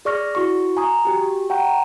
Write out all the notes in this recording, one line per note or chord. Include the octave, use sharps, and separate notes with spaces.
G#4 D5 C#6 F6 A#6
E4 F#4 C#6
G#5 A#5 D#6
F#4 G4
F#5 G5 A#5 C#6
A#5